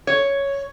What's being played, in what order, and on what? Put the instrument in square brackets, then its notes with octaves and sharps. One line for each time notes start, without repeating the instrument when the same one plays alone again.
[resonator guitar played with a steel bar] C#5